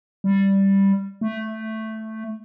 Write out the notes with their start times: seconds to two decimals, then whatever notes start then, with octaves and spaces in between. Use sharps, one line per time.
0.24 G3
1.21 A3